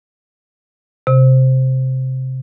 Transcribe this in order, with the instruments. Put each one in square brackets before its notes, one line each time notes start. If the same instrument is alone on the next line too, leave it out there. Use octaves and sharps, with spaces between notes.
[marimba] C3